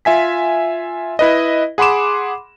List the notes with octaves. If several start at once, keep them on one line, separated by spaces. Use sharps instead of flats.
F4 E5 G#5 B6
E4 B4 D#5
G#4 F#5 B5 C6 D6 E7